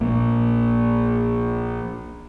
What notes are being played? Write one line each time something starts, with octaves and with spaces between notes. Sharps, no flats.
A#1 A#3